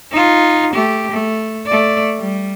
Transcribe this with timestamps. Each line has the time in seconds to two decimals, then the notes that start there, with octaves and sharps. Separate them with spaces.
0.12 D#4 F4
0.74 A3 G4
1.11 A3
1.66 A3 D5
2.18 G3